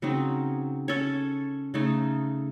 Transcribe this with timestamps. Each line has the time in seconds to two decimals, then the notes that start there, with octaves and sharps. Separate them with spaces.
0.02 C#3 F#3 C4 D#4
0.88 C#4 A4 C#5
1.74 C#3 A3 D#4 A4